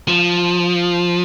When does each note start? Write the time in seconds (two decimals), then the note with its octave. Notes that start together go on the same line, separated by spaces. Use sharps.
0.08 F3